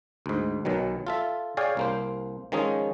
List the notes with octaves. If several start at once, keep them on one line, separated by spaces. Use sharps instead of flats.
D2 G#2
B1 B2 D#3 F#3
F4 A4 E5
G#4 C#5 D5 F5 G5 G#5
C2 A#3 C5
D#3 F3 G#3 C#4 D#4 G#4